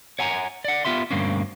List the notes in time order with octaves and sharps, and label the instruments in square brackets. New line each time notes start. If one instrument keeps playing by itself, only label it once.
[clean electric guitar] C#5 F#5 G#5 A#5
D5 F#5
B3 F4 G4 E5 C6
D2 G2 B2 A#3 C4 C#4